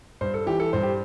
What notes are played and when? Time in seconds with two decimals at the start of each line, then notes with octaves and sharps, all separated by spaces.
0.21 G2 C5
0.34 A4
0.46 E3 G4
0.60 A4
0.73 G2 C5
0.83 G4